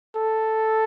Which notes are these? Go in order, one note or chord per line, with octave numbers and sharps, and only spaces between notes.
A4